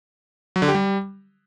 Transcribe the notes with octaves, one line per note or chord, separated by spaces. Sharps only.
F#3
D3
G4
G3